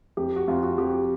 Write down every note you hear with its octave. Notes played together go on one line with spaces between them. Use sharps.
F2 G4
F#4
F2 F4
F#4
F2 G4